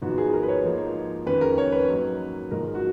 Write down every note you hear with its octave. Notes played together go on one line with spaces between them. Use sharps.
G#1 G#2 F3 B3 F#4
G#4
A#4
B4
C#5
G#2 F3 A#3 D#4
F2 D#3 G#3 C#4 B4
A#4
C#5
B4
G#2 F#3 A#3 D#4
G#1 G#2 F3 G#3 A#4
F#4